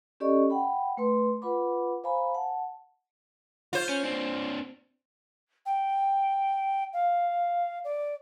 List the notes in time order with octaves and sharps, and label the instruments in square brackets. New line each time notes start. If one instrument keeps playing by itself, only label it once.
[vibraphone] C#4 G4 A4 D5 D#5 C#6
F#5 G5 B5
A3 B4 C6
F4 B4 F#5 B5 D6
C5 F5 G#5 A#5 B5
F#5 A5
[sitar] F4 C5
[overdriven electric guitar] C#4
C4 D4
[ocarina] G5
F5
D5